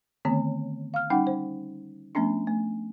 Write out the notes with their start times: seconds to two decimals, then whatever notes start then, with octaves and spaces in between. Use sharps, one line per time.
0.25 D3 D#3 A3 B3 C4
0.94 F5 F6
1.10 G3 C#4 D#4 F#5 G5
1.27 C5
2.15 F3 A3 B3 C#4 D4
2.47 A3